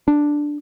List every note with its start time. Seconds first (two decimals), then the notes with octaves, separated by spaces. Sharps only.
0.08 D4